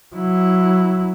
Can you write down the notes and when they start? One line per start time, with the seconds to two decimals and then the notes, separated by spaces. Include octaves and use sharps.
0.16 F#3 E4